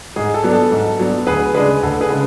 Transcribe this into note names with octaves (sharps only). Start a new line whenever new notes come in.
G#2 G#4
A4
F#3 B3 D4
A4
G#2
F#3 B3 D4
D2 G#4 B4
C#3 G#3 D4 G#4 B4
D2 A4
G#4 B4
C#3 G#3